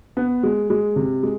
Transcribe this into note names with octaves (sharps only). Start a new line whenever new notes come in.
B3
G#3
G#3
C3
G#3